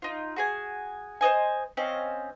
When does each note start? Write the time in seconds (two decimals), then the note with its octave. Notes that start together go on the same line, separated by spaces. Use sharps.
0.02 D#4 F4
0.36 F#4 G#4 G#5
1.21 C5 C#5 D#5 G#5
1.77 C4 C#4 D#5 F5